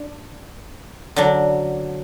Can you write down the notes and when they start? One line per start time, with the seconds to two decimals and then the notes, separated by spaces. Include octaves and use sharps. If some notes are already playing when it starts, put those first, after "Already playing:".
Already playing: D4
1.16 D3 F#3 D4